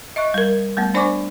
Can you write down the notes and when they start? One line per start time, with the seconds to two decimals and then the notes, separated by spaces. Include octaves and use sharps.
0.16 D#5 E5 C#6 F#6
0.34 G3 A#4
0.77 G3 A3 B3
0.94 D4 C5 D5 G#5 C#6 D6